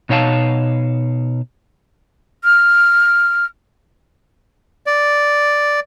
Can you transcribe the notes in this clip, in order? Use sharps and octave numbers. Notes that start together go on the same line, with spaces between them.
B2 D#4 C#5 F5 A5
F6
D5